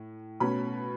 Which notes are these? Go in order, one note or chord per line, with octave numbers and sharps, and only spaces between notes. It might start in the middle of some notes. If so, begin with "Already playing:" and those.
Already playing: A2
B2 A3 C#4 B5